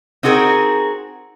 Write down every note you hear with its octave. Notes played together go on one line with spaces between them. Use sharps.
C4 D#4 F#4 G#4 A#4